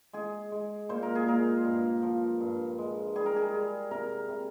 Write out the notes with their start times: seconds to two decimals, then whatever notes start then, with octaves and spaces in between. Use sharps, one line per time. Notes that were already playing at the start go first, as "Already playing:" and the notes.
0.13 G#3 G#4
0.52 G#3
0.89 A#2 C5
1.03 A#4
1.15 G#4
1.27 A#2 A#4
1.65 G2
2.02 F3
2.40 G2
2.79 G#3
3.16 G3 G#4
3.26 A#4
3.36 G#4
3.54 G3
3.91 C3 A#4
4.29 C3